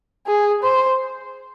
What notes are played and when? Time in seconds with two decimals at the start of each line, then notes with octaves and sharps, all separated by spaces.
0.27 G#4
0.63 C5